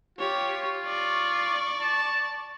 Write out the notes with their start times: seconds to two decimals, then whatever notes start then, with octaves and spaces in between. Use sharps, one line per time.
0.19 F4 G4 C#5
0.85 D5 C#6
1.80 A5